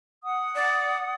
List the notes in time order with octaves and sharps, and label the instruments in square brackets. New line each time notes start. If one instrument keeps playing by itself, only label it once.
[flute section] F#5 D#6
[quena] D5